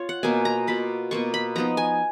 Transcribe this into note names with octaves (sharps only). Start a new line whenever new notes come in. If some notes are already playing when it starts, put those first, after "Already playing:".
Already playing: F4 C#5
F#5
B2 A#3 F4 G#5
A#5
B2 A#3 F4 B5
B2 A#3 F4 C#6
B5
F3 B3 D#4 A#5
G#5